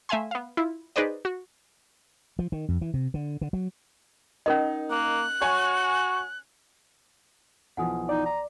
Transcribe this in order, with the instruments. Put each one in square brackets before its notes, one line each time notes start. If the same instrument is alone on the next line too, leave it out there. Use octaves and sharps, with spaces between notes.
[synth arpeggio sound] A3 E5 F5 G#5 C6
B3 F5
E4 F4
D#4 G#4 B4 C5 D5 D#5
F#4
[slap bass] F3
D#3
F2
E3
C3
D3
D3
F#3
[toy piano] C#4 A#4 D#5 [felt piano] D#4
[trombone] A#3 [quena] F#6
[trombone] F#4 [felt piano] C#5 G#5
[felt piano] B1 E3 F3 [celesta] F#5 G#5 D#6
[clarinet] D#4 [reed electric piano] D5
[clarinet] A#5